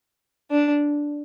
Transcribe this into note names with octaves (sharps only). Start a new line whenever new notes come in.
D4